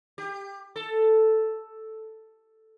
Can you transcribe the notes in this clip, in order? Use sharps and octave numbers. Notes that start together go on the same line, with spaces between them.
G4
A4